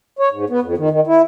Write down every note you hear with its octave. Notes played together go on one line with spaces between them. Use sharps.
C#5
G#2
B3
F2
D#3
D#3
E4